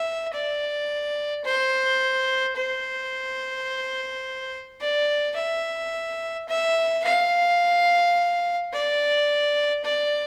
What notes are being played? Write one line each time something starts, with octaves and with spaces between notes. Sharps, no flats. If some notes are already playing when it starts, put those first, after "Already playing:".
Already playing: E5
D5
C5
C5
D5
E5
E5
F5
D5
D5